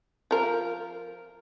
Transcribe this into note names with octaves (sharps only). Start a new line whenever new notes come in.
F3 A#4